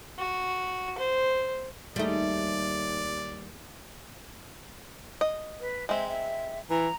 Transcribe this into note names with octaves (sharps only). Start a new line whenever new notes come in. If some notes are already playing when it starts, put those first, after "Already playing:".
F#4
C5
D#2 G3 A3 D#4 G#4 C5 D5
D#5
B4
G#3 C4 E5
E5
E3 A#5